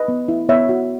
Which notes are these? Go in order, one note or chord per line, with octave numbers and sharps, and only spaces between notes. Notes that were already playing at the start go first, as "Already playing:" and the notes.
Already playing: B4 D#5
B3
E4
B3 C#5 E5
F#4